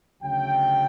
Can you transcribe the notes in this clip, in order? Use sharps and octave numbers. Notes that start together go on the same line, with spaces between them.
D2 C#3 F#3 A3 G5